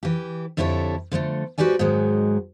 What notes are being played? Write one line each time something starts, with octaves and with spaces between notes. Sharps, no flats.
E3 G4
F2 D3 E4 G4 A4 C#5
D3 F3 F#3 A3
G#2 F#4 G4 B4 D5 G#5
G#2 D#3 F#3 G#3